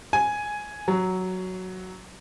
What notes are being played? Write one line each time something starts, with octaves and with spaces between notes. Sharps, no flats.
G#5
F#3